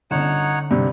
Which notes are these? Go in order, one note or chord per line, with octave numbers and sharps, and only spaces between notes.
G1 D3 C#4 D#4 C#5 F#5 E7
G2 C3